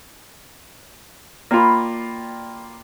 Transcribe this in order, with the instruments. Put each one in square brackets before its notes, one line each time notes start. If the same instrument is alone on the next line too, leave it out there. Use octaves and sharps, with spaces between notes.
[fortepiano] A#3 F4 [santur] D5 G5 B5